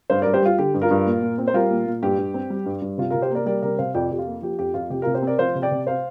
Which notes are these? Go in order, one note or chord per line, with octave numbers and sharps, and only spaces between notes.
G2 C5 F5
A#4 D5
G2
G4 C5
G3 F4
D3 G4
G2
F4 A#4
G2
A#2
A#2
C4
C5
G3 F4 A#4
A#2
A#2
G2 G4
G2
C4
G3
G2
G2
C3 F4
C3 F4 A#4
G4 C5
A#3 A#4 D5
G3 A#4 D5
C3 A#4 D5
C3 C5 F5
F2 D5 G5
F2 G4
F4
A#3
F3 G4
F2 G4
F2 F4
C3 G4
F4 A#4
C3
G4 C5
C4 A#4 D5
F3 C5 F5
C3
D5 G5
C3
C5 F5